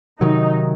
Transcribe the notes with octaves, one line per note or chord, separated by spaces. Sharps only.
C3 D#3 F#3 D#4